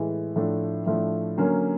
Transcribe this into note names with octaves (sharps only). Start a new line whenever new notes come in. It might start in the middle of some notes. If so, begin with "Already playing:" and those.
Already playing: A2 E3 G#3
A2 F3 A3 D4
A2 F3 A3 D4
D3 F#3 A#3 C#4